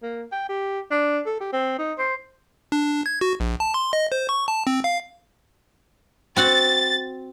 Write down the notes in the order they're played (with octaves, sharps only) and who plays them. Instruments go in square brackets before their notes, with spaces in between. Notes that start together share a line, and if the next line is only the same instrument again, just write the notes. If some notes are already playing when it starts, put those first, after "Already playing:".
[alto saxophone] A#3
G5
G4
D4
A4
G4
C4
D#4
C5
[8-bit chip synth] D4
G#6
F#4
A#1
A5
C6
D#5
C5
C#6
A5
C4
F5
[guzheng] C4 F#4 F#5 [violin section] A6